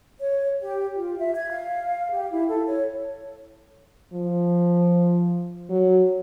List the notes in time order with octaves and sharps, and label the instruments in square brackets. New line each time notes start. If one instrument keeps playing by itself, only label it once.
[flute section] C#5
G4
F4
E5
G#6
F5
G4
E4
A4
C#5
[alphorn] F3
F#3